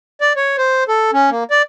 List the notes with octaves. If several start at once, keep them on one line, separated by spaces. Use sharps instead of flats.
D5
C#5
C5
A4
C#4
A#3
D5